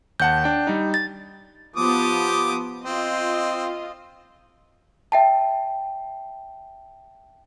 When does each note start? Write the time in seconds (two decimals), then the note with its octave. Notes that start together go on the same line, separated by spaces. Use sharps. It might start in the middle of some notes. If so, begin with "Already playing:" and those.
0.20 D#2 F#5 A5 G6
0.44 D4 G5
0.67 G3 D#4
0.94 A6
1.76 F3 B3 G4 D6 D#6
2.84 C4 F4 D#5
5.12 E5 G5 A5